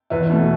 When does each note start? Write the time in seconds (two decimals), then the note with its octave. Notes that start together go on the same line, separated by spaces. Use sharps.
0.10 E2 B4 E5
0.30 B2 A3